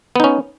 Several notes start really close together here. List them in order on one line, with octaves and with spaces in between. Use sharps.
B3 D#4 C#4